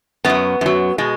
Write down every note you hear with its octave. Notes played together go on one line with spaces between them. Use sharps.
F#2 F#3 B3
F#2 F#3
B2 G#3